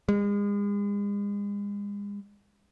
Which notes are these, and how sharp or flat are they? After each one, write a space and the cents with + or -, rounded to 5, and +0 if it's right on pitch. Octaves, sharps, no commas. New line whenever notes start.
G#3 -40